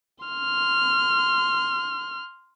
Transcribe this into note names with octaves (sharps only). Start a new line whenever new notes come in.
C6 F6